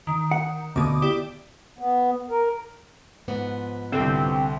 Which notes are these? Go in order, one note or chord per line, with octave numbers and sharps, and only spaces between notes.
D#3
F#5
D2 B2 D6 D#6
E4 G4 D5
B3
A#4
G#2 F3 B3
C2 D3 C4